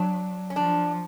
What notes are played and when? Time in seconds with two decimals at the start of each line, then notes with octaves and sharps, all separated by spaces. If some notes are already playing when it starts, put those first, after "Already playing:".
Already playing: F#3 D4
0.50 C#4
0.56 F3 D4